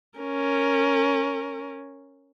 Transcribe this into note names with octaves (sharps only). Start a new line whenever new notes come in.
C#4 A#4